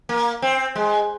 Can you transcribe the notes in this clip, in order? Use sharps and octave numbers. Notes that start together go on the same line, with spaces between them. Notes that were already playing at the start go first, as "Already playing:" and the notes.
A#3
C4
G#3